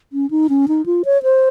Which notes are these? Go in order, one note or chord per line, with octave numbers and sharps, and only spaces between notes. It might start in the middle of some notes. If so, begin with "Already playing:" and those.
C#4
D#4
C#4
D#4
F4
C#5
C5